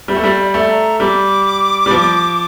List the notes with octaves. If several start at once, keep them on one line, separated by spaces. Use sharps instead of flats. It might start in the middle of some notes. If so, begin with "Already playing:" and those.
G3 E5
A3
G3
E5
D5
A3
A#5
G3 D6
G3
F3